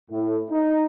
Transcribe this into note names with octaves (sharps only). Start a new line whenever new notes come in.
A2
D#4